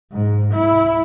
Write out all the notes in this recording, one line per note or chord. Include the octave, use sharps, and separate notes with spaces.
G#2
E4